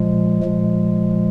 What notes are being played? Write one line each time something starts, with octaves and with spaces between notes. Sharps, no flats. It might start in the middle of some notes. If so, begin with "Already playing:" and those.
Already playing: A#2 F3 G#3
A#2 F3 G#3